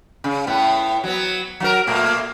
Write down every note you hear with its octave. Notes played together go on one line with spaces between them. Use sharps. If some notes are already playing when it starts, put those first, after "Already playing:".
C#3
A2 B3
F#3 B3
F#3 F4 A#4
A#2 A3 A#3